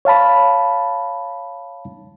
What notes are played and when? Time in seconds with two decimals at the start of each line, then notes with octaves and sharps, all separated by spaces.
0.05 C#5 F5 A5 B5